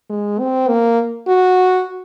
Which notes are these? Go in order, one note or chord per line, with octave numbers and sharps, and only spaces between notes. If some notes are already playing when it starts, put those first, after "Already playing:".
G#3
C4
A#3
F#4